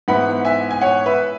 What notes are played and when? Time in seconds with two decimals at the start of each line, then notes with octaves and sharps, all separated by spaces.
0.08 G#2 E3 B3 E4 F#5 B5
0.45 E5 G#5
0.71 G#5
0.81 C#5 F#5
1.06 B4 E5